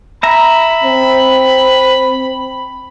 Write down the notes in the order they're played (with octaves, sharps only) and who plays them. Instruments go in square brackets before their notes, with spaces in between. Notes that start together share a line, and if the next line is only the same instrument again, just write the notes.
[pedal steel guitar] E5 A#5 [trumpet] B5
[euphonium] C4